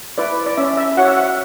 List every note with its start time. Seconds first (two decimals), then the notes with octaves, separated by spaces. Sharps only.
0.18 E4 B4 D5
0.46 D5
0.57 C#4 E5
0.77 E5
0.97 F#4 C#5 F#5
1.08 E5
1.17 F#5